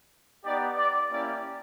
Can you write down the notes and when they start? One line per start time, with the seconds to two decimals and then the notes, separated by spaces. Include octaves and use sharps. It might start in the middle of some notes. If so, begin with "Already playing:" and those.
0.44 B3 D#4 G4 D5
0.77 D5
1.10 A#3 C#4 E4 G4 D5